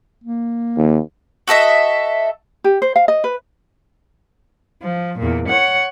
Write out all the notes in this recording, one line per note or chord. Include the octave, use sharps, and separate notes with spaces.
A#3
D#2
F#4 A4 D#5 E5
G4
C5
F5
D#5
B4
F3
E2 A#2
C#5 F#5